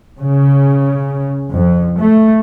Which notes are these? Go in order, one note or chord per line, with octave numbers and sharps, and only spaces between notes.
C#3
F2
A3